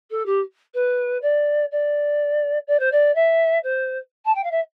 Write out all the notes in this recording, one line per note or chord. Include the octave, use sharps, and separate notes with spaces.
A4
G4
B4
D5
D5
D5
C5
D5
E5
C5
A5
G5
F5
E5